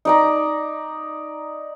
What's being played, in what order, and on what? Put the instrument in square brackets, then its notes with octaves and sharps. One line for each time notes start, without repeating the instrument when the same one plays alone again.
[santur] D#4 D5 A#5